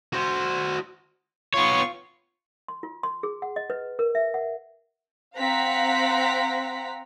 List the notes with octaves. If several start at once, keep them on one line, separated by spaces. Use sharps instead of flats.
F#4 C5
B3 F4 C#5 C#6
C6
F4
C6
G#4
F#5
D#5
B4
A#4
E5
F#5
C4 F5 F#5 A#5 B6